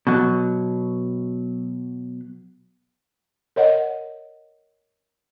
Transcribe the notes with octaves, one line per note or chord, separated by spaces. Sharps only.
B2 F#3
A#4 C#5 D#5 F#5